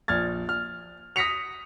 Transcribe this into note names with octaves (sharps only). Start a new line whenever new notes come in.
A#1 F6 G#6 A6
F6
D#6 A#6 B6 C#7 F7